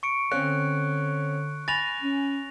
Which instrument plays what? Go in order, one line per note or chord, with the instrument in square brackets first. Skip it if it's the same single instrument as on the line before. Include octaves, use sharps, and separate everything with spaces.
[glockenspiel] C#6 C#7 D7
[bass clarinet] D3 [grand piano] C4 C#4 [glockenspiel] F#6
[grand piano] G#5 B5 [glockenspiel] A6 A#6 F7
[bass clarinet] C#4